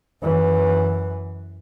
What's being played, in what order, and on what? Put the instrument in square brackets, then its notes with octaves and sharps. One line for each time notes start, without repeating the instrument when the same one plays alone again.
[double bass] F#2 E3